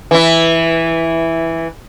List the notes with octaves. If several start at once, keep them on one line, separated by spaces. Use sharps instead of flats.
E3 E4